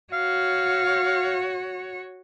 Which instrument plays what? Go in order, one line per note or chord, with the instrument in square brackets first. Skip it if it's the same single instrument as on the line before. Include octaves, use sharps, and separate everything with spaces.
[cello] F#4 C#5 [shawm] F5